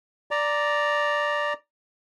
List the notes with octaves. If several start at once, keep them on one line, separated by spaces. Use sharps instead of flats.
D5 A#5